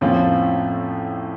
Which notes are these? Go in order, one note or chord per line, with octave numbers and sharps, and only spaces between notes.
F2 A2 F3 A#3 C#4 F4